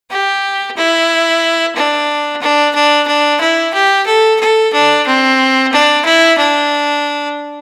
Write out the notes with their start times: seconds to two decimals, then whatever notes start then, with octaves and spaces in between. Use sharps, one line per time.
0.11 G4
0.77 E4
1.76 D4
2.41 D4
2.75 D4
3.07 D4
3.41 E4
3.74 G4
4.06 A4
4.40 A4
4.73 D4
5.07 C4
5.73 D4
6.05 E4
6.38 D4